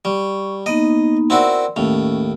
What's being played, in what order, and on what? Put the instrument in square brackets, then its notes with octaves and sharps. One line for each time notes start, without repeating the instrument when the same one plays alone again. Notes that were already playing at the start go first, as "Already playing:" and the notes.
[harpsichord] G3 [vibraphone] C#6
[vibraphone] A#3 B3 D#4 [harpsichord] D#5
[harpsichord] C4 E4 F#4 [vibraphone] A#4 D5 C6
[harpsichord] D#2 A2 [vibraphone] C#4